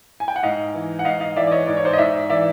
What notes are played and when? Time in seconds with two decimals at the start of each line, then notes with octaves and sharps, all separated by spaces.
0.20 G#5
0.28 G5
0.36 F#5
0.43 G#2 D#5 F5
0.74 E3
0.99 F#5
1.05 G#2 D#5 F5
1.20 D#5 F5
1.36 E3 D5 E5
1.47 D5
1.51 C#5 D#5
1.67 G#2 D5
1.77 C#5
1.85 C5 D5
1.93 D#5
1.98 G#2 D5 E5
2.30 E3 D5 E5